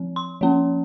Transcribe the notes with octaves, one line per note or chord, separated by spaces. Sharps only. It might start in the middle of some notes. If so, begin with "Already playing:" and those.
Already playing: F3 C4
C6
F3 A#3 C#4